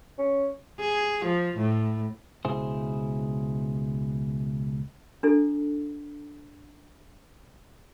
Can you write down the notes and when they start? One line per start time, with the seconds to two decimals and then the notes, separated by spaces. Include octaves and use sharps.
0.19 C#4
0.80 G#4
1.25 F3
1.57 A2
2.45 C#2 B2 E4 G#4 C5
5.23 D4 E4 A4